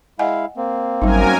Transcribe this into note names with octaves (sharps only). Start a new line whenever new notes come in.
G#3 E4 D#5 F5 F#5 G#5
A#3 C4
G#1 F#2 G3 D#4 A#4 G#5